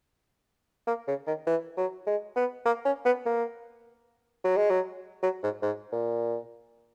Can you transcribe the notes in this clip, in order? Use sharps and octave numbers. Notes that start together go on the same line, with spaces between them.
A#3
C#3
D#3
E3
F#3
G#3
B3
A#3
C#4
B3
A#3
F#3
G#3
F#3
F#3
G#2
G#2
A#2